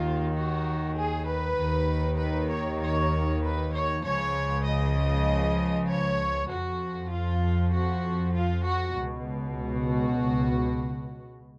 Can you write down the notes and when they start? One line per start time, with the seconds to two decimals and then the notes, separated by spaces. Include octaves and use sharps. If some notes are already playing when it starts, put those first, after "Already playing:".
Already playing: D#2 D#3 F4
0.35 F#4
0.97 G#4
1.27 B4
1.58 D#2 D#3
2.19 B4
2.50 C#5
2.81 C#5
3.42 B4
3.73 C#5
4.03 C#2 C#3 F3 C#5
4.66 D#5
5.88 C#5
6.50 F2 F3 F#4
7.11 F4
7.73 F#4
8.34 F4
8.65 F#4
8.96 C#2 B2
9.57 F#4